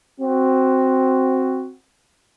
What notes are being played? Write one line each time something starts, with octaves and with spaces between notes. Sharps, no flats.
C4 F#4